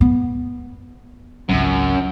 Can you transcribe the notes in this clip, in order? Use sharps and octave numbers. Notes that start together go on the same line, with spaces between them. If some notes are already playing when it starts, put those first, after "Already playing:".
B3
G#1 C#2 F#2